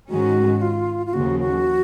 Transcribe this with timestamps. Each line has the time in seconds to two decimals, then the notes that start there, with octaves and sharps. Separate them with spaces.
0.09 G#2 D#3 G#3 C#4 F#4
0.62 F4
1.06 F4
1.13 D#2 C#3 F3 A#3 F#4
1.39 F#4